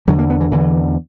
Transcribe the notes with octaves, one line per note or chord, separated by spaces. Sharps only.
E2 D3 F#3
A#3
B3
E3
E2 D3 E3